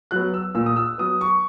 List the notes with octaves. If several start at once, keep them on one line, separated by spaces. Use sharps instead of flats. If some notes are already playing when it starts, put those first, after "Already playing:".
F#3 B3 F#6
E6
A#2 E6
D#6
E6
F#3 B3 D#6
C#6